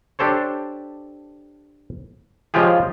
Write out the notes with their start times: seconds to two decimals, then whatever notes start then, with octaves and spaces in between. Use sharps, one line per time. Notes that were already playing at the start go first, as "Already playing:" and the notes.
0.19 D4 G4 A4 C5 C#5
2.54 C#3 F3 G#3 F4 G4 G#4